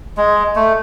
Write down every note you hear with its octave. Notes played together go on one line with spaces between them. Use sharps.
G#3
A3